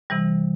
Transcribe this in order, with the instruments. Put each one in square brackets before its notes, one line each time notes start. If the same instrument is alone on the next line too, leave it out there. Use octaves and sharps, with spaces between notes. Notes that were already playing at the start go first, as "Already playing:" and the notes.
[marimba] C3 E3 G3